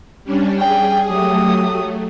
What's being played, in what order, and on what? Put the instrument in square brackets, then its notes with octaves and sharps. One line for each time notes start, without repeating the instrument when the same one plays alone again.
[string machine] G3 C#4 D4
[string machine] G#4 [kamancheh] G5
[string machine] F#3 A3 [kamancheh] G4 D#6